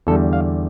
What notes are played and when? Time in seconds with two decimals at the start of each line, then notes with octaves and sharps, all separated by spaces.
0.07 E2 D3 G3 A4
0.33 F5